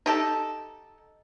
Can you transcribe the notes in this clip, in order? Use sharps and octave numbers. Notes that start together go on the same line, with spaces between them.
D#4 G4 A4